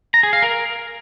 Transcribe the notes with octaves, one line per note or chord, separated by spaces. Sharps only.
A#5
G#4
F5
A#4